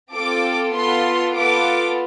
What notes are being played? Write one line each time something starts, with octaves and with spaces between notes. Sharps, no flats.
C4 F4 A4 D6
B3 F4 A4 C6
B3 F4 A4 D6